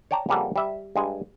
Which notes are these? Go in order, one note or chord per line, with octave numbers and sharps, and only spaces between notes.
C#5 D5 G5 A5 A#5
F2 C#3 G3 A#3 A4 F#5
G3 E5
G2 G#3 G#5